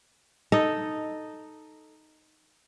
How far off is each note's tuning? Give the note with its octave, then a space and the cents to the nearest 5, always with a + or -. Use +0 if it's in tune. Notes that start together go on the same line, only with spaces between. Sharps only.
D#4 +0 A4 +0 D#5 -5